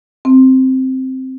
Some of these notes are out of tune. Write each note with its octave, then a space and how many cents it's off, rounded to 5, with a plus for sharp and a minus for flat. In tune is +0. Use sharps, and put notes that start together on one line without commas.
C4 +0